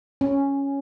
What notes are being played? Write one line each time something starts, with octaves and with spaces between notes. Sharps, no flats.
C#4